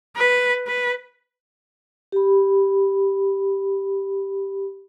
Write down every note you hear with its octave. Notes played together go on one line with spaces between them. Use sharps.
B4
B4
G4 B5